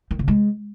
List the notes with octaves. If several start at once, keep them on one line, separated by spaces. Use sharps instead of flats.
D#3
C#3
G#3